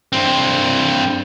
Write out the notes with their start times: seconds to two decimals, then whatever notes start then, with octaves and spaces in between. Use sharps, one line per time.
0.13 G2 C4